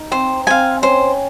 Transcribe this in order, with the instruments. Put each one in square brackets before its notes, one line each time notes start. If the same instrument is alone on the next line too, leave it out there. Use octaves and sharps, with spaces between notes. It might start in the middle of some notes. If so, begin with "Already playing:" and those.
Already playing: [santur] D#4
[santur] C4 [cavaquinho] C5
[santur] C4 [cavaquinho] F5 G#5
[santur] C#4 [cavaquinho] C5